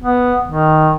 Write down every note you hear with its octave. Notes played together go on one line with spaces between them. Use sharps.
B3
D#3